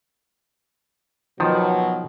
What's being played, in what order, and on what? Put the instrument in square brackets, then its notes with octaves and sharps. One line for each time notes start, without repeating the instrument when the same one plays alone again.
[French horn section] B2 F#3 [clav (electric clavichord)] D#3 F3